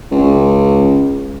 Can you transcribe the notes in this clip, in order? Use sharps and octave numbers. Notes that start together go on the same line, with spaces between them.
C#2